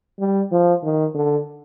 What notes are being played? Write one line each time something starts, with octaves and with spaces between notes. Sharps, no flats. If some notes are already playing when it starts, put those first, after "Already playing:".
G3
F3
D#3
D3